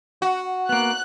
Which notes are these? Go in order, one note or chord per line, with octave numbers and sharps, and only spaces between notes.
F#4
A#3 B3 F#6